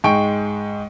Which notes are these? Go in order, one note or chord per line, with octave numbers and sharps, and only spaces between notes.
G#2 G#3 G5 C#6 D7